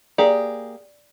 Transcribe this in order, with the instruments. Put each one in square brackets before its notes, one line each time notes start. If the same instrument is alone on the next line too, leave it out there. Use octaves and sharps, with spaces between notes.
[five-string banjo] A#3 G4 G#4 [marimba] D5